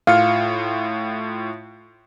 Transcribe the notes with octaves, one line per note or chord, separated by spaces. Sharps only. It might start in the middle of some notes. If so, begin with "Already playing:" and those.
A2 F4 F5 C#7